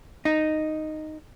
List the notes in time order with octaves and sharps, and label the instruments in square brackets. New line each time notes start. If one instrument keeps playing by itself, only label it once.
[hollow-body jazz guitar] D#4